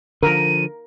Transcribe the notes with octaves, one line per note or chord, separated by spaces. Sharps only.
D3 F3 A#4 D#7